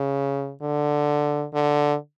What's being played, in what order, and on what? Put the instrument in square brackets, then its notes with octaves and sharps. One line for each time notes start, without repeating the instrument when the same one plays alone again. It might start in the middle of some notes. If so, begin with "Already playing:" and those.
Already playing: [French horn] C#3
D3
D3